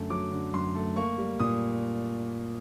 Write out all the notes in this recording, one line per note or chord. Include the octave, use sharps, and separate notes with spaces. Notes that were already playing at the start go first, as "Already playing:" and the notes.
Already playing: F#2 D3 F#3 A3
F#3 D6
D3
F#2 C6
A3
A#3 C#6
G3
A#2 D#6